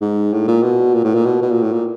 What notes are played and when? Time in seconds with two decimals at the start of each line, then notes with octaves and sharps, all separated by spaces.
0.01 G#2
0.33 A2
0.48 A#2
0.63 B2
0.94 A#2
1.04 A2
1.14 A#2
1.26 B2
1.42 B2
1.51 A#2
1.62 A2
1.72 A#2